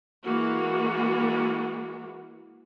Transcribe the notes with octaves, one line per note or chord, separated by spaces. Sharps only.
E3 G#3 A#3 F#4